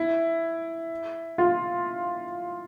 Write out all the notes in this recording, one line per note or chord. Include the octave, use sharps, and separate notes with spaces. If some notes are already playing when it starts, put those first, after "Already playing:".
Already playing: E4
F4